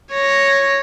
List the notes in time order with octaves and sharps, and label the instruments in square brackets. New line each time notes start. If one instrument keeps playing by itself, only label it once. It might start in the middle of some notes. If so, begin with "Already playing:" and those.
[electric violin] C#5 A#6